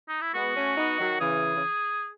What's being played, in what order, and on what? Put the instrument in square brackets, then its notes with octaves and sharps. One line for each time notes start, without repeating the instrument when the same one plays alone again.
[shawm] D#4
E4
[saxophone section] G#3 B3 [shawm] F#4
[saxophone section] A3 C#4
B3 D#4
D#3 F#3
[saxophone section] C#3 E3 [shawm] G#4
[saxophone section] C#3